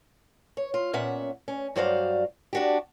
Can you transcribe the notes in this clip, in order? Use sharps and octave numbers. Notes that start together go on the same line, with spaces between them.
C#5
F4
A#2 B3 C#4 E5 F#5
C#4
G2 F#3 F#4 C5 D5 F5
D4 F#4 G4